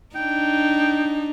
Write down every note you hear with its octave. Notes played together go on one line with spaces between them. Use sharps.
D4 D#4 G5